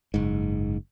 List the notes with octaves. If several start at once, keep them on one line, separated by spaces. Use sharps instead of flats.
F#1 G#2